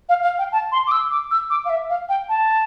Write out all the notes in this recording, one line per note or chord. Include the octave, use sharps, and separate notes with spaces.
F5
F5
G5
A5
C6
D6
E6
D6
E6
D6
F5
E5
F5
G5
A5